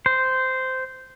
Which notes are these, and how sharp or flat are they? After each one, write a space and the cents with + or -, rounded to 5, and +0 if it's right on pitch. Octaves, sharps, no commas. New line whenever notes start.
C5 -10